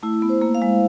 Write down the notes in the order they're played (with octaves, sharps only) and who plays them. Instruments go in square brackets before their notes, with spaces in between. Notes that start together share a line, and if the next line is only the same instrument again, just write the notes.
[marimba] A3 [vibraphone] E4
[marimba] B3
[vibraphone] C5
[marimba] A#3
[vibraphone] F5
[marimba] G#3